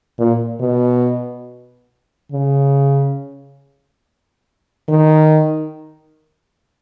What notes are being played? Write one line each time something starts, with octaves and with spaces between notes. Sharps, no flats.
A#2
B2
C#3
D#3